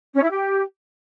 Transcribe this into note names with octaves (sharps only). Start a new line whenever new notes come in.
C#4
E4
G4